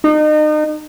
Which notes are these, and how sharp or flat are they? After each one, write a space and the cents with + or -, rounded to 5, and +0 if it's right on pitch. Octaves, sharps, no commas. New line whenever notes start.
D#4 -35